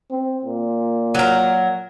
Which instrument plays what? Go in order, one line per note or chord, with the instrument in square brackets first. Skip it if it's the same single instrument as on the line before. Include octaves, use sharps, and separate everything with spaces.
[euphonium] C4
A#2
[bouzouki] F#3 A#4